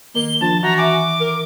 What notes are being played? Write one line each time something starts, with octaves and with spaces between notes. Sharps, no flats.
D#3 A#3 G7
F3 D4 A5
E3 F#4 A#5
E5 G#5 D6
A#4